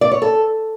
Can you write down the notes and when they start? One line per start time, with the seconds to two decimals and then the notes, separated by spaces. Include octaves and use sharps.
0.01 D5
0.12 C#5
0.22 A4